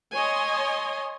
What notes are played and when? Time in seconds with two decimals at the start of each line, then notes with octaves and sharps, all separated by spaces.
0.15 C#5 D#5 G#5 C6